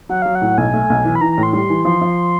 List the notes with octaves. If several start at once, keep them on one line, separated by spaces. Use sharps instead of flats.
F#3 F#5
F#3 F5
F#5
A2
B1 G#5
A3
B1
E3
B5
E3 A#5
A#5
A2
C6
G3 C6
E3
F3 C6
F3